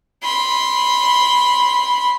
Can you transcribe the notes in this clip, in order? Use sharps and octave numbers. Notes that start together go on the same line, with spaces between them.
B5 C6